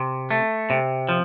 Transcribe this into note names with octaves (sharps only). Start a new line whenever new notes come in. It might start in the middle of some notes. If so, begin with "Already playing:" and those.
Already playing: C3
A3
C3
F3